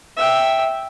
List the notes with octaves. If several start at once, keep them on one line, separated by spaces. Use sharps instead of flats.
E5 G5